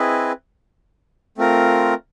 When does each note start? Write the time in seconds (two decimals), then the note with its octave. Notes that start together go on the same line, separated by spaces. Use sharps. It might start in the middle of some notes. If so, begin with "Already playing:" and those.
Already playing: C4 E4 G#4 B4 D#5
1.38 A3 C4 F4 A#4